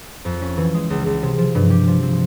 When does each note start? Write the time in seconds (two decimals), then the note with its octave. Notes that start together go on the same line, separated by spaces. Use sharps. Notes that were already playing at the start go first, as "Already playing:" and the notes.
0.25 F2
0.41 C#4
0.57 E3
0.74 G#3
0.90 C#2
1.06 C#2
1.22 C3
1.38 F3
1.55 G2
1.70 G4
1.87 F3
2.02 C4